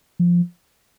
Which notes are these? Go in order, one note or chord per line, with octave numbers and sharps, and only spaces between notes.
F3